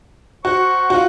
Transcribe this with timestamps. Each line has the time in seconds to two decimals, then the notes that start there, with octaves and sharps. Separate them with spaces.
0.45 F#4 C5 F#5 C#6
0.90 F4 F#4